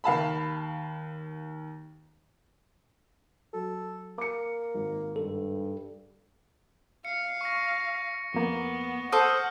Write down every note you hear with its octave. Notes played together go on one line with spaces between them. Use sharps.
D#2 F5 A5 B5
F#3 A4
A#3 D6 C#7
G#1
G2 A4
F5 C#7
C#6 A#6
F2 A#3 B3
A4 C5 F#5 D#6 F6 G6 C7